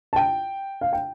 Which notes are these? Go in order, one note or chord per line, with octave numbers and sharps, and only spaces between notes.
A5
G5
F5
G5